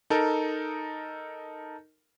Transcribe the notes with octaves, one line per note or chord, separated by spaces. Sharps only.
D#4 A4 A#4